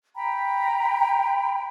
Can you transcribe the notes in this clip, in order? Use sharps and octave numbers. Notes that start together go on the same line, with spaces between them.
G5 A#5 B5